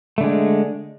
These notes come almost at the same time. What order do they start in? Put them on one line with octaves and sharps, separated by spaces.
A3 D3 G#3